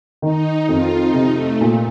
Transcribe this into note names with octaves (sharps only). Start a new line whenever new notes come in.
D#3 D#4
F2 F4
D#4
C3
A3
A#2